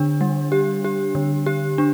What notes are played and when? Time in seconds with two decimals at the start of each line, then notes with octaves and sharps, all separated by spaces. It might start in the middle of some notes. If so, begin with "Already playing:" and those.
Already playing: D3 D4
0.21 G3
0.52 G4
0.85 G4
1.15 D3
1.46 G4
1.78 D4